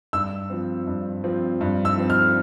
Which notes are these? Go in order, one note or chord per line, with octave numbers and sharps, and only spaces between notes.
G2 E6
F3 C4
G2
F3 C4
G2
E6
F3 C4
F6